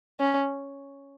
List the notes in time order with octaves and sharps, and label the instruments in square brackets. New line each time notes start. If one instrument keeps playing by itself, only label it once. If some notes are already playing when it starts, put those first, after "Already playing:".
[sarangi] C#4